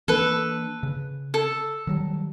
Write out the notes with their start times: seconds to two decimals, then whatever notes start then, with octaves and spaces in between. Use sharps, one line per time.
0.08 E3 A#3 D4 A4 B4
0.83 C#3
1.34 A4
1.87 D#3 F#3 G3